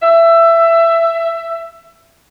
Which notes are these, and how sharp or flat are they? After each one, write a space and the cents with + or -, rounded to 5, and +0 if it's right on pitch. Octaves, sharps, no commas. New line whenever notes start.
E5 +15